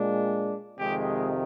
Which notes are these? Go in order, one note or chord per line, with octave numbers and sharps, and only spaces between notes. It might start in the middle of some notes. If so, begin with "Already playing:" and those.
Already playing: A#2 G#3 D4
F2 C3 D#3 G#3 G4